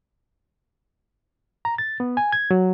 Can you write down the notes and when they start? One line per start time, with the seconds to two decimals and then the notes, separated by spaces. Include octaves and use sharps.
1.65 A#5
1.78 A6
2.00 B3
2.17 G#5
2.33 G#6
2.51 F#3